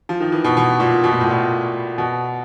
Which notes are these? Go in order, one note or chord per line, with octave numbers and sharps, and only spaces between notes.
F3
D#3
E3
B2
B2
A#2
B2
A#2
A2
A#2
B2